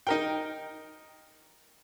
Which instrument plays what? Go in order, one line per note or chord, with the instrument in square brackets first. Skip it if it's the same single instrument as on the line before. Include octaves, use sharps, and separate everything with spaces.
[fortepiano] D#4 A#4 G5